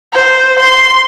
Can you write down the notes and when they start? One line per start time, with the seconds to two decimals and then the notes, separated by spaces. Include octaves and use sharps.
0.13 C5
0.59 C6